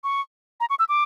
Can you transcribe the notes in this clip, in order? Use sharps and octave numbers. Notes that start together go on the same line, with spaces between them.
C#6
A#5
C#6
E6
D6